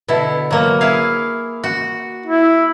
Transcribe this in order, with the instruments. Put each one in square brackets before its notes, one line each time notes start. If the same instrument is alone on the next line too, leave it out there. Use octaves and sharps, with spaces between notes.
[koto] B2 D3 E4
F#3 A#3
E4 G#4 F5
F#4
[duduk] E4